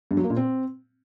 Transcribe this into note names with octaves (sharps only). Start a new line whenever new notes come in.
G2
F#3
A#3
A#2
C4